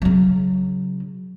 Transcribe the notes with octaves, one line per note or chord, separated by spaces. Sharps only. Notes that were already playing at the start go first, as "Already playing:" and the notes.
C#3 F#3